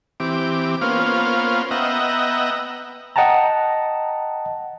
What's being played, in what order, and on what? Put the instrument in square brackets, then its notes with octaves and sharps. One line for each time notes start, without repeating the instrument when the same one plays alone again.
[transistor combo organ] E3 C4 G4 D6
A#3 B3 C#4 F4 C5 F5
B3 D#5 E5 F#5 G5 A#5
[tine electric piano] D#5 F#5 G5 A5 A#5